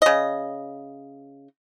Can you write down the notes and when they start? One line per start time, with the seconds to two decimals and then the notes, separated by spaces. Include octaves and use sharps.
0.02 C#3 D#5